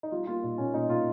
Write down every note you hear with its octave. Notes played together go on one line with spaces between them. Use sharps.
D#4
G3 F4
A#3 F4
A#2 D#4
A#2 C#4
A#2 D#4
A#2 F4